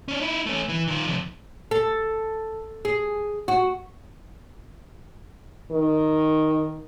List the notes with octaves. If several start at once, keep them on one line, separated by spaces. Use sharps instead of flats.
C#4 D4
D#4 E4
A3 C#4
E3
D#3 F4
F2 C3
A4
G#4
F#4
D#3